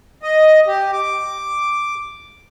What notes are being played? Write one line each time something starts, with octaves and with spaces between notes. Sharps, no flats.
D#5
G4
D6